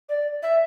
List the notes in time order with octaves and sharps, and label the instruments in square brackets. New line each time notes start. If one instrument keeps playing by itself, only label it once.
[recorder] D5
E5